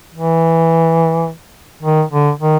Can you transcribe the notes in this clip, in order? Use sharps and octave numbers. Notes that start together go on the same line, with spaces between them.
E3
D#3
D3
D#3